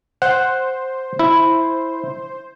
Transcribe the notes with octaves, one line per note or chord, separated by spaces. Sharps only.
C5 F#5
E4